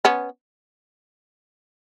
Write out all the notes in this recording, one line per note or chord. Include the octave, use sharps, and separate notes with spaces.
B3 C#4